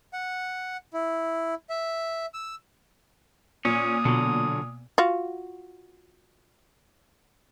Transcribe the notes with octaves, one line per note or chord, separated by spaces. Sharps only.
F#5
E4
E5
E6
A#2 C#4 D#6
B2 D3 F#3
F4 F#4 F5